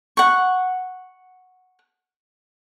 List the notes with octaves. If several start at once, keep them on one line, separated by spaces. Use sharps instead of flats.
F#5 C#6